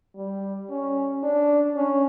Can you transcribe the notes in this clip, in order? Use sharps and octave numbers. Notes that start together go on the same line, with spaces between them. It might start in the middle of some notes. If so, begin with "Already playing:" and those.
G3
C#4
D4
C#4